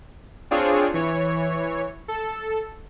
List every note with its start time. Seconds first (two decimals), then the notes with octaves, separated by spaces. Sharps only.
0.51 C4 D4 F4 G#4 C#5
0.94 E3 C#5
2.08 A4